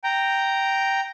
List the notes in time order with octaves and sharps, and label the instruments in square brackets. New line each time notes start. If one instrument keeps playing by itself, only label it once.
[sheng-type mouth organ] G5 A#5